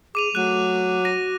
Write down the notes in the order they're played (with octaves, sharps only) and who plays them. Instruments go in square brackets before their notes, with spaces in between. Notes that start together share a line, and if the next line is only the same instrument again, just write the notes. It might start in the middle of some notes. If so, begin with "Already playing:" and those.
[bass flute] G#4 [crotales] D6 D#7 F7
[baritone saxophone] F#3 [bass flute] A3 [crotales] F#6 D#7
[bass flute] F#4 [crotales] A#6 D#7